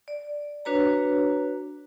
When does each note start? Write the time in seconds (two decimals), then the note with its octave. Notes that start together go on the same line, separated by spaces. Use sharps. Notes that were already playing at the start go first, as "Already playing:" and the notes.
0.08 D5
0.65 D4 F#4 B4 C#5 A#5